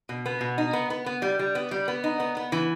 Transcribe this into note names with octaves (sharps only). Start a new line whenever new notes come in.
B2
B3
B2
D#4
B3
B3
B3
G3
G3
B3
G3
B3
D#4
B3
B3
E3